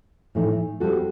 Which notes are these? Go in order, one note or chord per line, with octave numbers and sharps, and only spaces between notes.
A2 E3 A3 D#4
G3 C4 F#4 A4